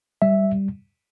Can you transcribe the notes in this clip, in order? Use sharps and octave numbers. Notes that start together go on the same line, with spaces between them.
G3 E5